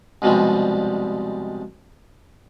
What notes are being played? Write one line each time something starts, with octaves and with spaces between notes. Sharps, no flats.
C2 B2 F3 G3 G#3